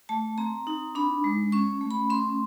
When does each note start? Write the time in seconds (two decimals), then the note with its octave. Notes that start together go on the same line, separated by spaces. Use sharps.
0.09 A3 A5
0.38 C4 A#5
0.67 D#4
0.95 D4 B5
1.24 G#3
1.52 C#4 C#6
1.81 A3
1.91 B5
2.10 C#4 C6